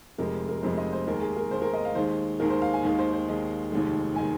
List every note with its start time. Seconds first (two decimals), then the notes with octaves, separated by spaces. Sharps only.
0.18 F1 F2 C3 F3 G#3 A#4
0.49 A#4
0.62 F1 F2 C3 F3 G#3 C5
0.77 D#5
0.93 C5
1.07 D#2 D#3 G#3 A#4
1.22 G#4
1.36 A#4
1.51 D#2 D#3 G#3 C5
1.62 A#4
1.74 D#5
1.85 F5
1.95 D#2 D#3 G#3 C5
2.40 D#2 D#3 G#3 A#4
2.50 C5
2.62 F5
2.73 G#5
2.83 D#2 D#3 G#3 F5
2.99 C5
3.13 C5
3.28 D#2 D#3 G#3
3.72 F1 D#2 D#3 G#3
4.16 D#3 G#3 G#5